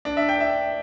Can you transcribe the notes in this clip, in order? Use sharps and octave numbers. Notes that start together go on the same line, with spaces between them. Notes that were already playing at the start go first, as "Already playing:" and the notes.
D4
E5
G5
E5